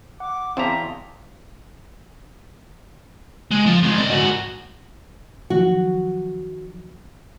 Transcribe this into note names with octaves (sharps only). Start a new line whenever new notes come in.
F#5 D6
E2 C4 F5 A5 A#5 C6 B6
G#3
F3
G#3 C4
D5 D#5
G#2 F#4
D#3 F3 F#3 F#4